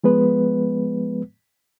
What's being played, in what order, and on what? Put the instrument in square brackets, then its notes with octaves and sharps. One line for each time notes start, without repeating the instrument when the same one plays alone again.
[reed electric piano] F3 G#3 B3 B4